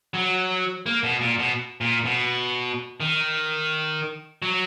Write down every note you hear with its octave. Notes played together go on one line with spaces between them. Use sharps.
F#3
A#3
B2
A#2
B2
A#2
B2
D#3
F#3